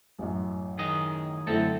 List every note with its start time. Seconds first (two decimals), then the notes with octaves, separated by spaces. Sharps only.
0.19 A1 F#2
0.79 D#3 G#4 D#5
1.47 F#2 D3 A3 C4 E4 A4